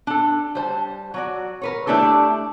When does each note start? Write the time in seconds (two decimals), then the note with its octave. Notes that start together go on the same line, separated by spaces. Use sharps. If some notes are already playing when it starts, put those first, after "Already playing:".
0.07 D4 A4
0.55 G3 C5 A5
1.14 F#3 F#4 D5
1.62 A#4 B4 C#5
1.87 A3 D4 E4 G4 A4